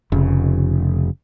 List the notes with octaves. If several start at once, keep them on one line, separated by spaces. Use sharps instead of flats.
F1 C#3